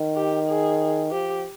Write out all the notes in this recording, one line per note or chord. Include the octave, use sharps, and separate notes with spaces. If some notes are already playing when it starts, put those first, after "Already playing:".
Already playing: D#3
G4
G#4
F3 G4